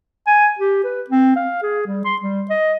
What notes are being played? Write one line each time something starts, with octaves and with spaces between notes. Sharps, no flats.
G#5
G4
B4
C4
F5
G#4
G3
C6
G3
D#5